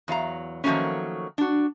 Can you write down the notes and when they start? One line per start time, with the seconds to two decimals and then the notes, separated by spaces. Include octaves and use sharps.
0.08 E2 F#3 F5 A#5
0.64 D#3 F3 F#3 A3 A#3 C#4
1.38 D4 F#4